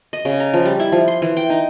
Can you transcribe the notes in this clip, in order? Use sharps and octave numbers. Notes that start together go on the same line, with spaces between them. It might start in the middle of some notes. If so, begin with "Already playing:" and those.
D#5
C#3
A#5
F3
G3
E4
F3
C6
E3
G5
D#4